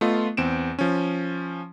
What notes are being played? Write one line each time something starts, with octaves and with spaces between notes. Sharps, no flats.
A3 B3 F4 D#5
E2 C4 D7 E7
F3 C#4